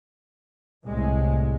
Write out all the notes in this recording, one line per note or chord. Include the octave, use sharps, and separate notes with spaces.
C2 A2 G#3